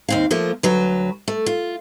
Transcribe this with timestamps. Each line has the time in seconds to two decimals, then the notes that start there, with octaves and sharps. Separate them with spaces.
0.08 D#2 C4 F5
0.31 F3 A3 A#3
0.63 D2 F#3 B4
1.28 A3
1.46 F4